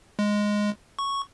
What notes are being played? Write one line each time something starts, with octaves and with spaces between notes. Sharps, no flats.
G#3
C#6